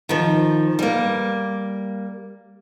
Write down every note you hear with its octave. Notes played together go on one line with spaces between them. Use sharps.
D#3 F3
G3 A#3